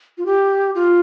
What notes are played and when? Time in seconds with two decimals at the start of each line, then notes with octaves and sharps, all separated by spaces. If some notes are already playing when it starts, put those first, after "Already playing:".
0.18 F4
0.26 G4
0.75 F4